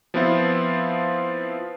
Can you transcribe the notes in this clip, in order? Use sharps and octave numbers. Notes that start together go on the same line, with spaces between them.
F3 B3 C4 E4 F4 C5